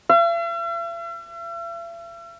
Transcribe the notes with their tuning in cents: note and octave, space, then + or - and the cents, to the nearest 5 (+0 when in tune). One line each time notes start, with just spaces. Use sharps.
E5 +45